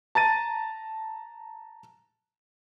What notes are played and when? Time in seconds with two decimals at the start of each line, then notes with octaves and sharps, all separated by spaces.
0.15 A5 A#5 A6 D#7